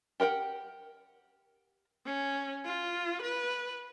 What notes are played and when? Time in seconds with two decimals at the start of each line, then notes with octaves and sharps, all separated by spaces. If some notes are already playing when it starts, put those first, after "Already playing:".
0.20 G4 A#4 F#5 G5
2.06 C#4
2.65 F4
3.23 B4